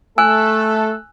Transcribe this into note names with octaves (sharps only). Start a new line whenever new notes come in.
A3 A4 G#5 E6 F#6